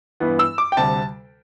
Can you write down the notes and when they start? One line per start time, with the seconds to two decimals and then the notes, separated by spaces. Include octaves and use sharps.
0.20 G2 E3 B3
0.39 E6
0.58 D6
0.72 G5
0.77 D2 C3 G3 A5